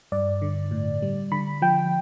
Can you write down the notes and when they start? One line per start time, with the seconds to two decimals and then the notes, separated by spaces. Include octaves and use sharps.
0.12 G2 D5
0.42 D3
0.71 A2
1.02 G3
1.32 D3 B5
1.62 F3 G5